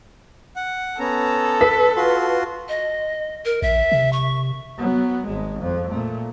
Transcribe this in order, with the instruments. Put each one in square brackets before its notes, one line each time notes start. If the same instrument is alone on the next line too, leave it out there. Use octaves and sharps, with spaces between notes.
[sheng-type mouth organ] F#5
[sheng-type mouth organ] B3 C#4 A#5 [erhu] A4
[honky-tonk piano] B4 B6
[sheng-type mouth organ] F4 F#4 C6
[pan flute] D#5
A#4
[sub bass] A#1 [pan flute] E5
[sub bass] C3
[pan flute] C#6
[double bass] F#3 B3
G#1 G#3
F2 F3
A#2 A3